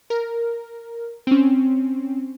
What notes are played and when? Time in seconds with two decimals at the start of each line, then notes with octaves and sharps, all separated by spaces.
0.10 A#4
1.27 C4 C#4